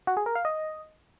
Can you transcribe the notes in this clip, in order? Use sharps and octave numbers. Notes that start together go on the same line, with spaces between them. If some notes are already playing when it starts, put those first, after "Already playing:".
F#4
G#4
A#4
F5
D#5